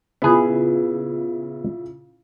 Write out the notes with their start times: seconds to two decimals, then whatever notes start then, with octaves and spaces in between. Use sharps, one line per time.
0.22 A#2 C#3 B3 E4 G#4